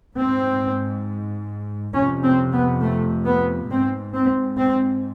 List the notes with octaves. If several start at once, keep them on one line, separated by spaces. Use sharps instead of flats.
G#2 C4
F2 C3 C#4
C4
B3
A3
B3
G#2 C4
C4
C4